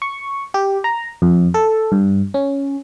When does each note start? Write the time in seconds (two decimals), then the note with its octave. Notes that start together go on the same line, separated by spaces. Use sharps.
0.02 C#6
0.54 G4
0.84 A#5
1.22 F2
1.54 A4
1.92 G2
2.34 C#4